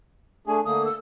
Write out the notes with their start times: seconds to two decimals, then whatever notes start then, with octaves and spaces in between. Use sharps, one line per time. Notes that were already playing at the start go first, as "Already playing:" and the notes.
0.47 A3 D4 G#4 G#5
0.65 D3 A3 A#3 D#6
0.85 E6